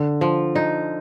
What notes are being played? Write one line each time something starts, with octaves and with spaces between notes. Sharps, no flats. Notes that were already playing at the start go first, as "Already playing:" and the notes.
Already playing: D3
F3
D#4